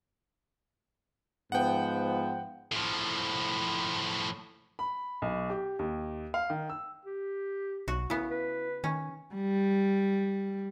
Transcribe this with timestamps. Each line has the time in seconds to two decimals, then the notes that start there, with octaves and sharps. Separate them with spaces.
1.52 G#2 F3 B3 F#5 G5
2.72 A2 F3
4.79 B5
5.22 B1
5.50 G4
5.79 D#2
6.34 F5
6.50 D#3
6.70 E6
7.05 G4
7.88 B1 F#4
8.10 C#3 B3 E4
8.30 B4
8.84 D#3 C#4
9.35 G3